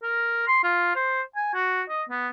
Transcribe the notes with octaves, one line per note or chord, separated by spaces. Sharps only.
A#4
C6
F4
C5
G#5
F#4
D#5
B3